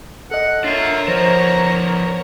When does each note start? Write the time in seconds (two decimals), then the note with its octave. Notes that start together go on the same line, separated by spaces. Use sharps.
0.31 A4 D#5 F#5
0.64 D4 F4 A#4 C#5 E5
1.08 F3 B3 C5 A#5